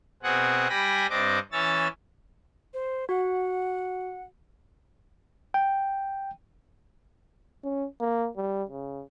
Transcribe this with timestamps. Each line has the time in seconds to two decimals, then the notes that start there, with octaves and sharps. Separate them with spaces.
0.23 B2 C4 G#4 F#5
0.69 G3 G5 G#5 B5 A#6
1.10 G2 C4 D4 D#5 D6
1.52 E3 C#4 C#5 E6 A6
2.74 C5
3.09 F#4 F#5
5.54 G5
7.64 C#4
8.00 A#3
8.37 G3
8.69 C#3